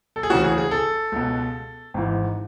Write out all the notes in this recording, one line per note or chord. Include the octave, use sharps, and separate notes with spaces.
A4
G#4
D2 C#3 E3 F#4
G#4
G#4
A4
C#2 B2
G#1 G#2 E3